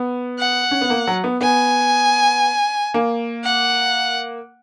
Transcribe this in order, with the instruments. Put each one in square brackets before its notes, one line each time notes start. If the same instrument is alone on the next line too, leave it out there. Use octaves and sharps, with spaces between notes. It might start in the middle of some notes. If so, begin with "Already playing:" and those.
Already playing: [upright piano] B3
[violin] F#5
[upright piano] C#4
B3
A#3
F#3
B3
[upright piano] B3 [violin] G#5
[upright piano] A#3
[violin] F#5